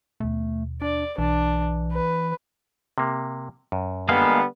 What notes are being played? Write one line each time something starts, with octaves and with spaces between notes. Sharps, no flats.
D#2 B2 A3
D4 D5
B1 E3 D4
B4
C3 A#3
F#2
D3 G3 G#3 A#3 B3 F5